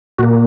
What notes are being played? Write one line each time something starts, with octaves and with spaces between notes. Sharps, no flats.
A#2 A#3 F#4